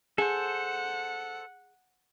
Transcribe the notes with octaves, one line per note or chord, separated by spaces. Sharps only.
G#4 A4 C5 F#5